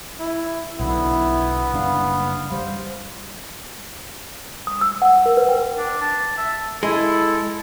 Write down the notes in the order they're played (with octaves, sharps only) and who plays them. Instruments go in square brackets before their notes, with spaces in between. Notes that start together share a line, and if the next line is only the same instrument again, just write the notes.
[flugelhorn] E4
[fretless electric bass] B1 B2 D3 [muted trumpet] B3 [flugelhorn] E4
[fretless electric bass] F#1 G3 D4 [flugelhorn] F5
[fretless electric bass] G3 [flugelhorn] C5
[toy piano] D#6
E6
F#5
A#4
B4
G5
[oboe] D4
A5
E5
[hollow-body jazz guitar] G#3 [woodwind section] E4 [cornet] A4